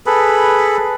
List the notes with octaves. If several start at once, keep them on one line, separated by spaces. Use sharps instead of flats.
G#4 A4 B4 B5